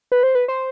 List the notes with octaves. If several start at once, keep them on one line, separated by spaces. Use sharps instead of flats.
B4
C5
B4
C5